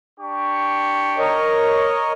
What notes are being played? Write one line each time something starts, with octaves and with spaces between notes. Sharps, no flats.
D4 G4 C#6
A#4 C#5 D#5